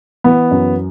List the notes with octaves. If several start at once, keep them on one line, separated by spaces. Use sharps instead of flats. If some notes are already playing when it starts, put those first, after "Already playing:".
E3 B3
F#2